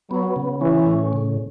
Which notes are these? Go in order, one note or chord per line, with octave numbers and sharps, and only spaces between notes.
F#3 B3
C#3
E3 C#4
A2
C#3